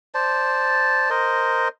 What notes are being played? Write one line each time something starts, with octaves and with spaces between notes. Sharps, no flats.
C5 D5 A5
A#4 C5 D#5